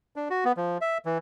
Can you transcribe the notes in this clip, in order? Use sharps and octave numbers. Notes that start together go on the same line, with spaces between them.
D4
F#4
B3
F3
E5
E3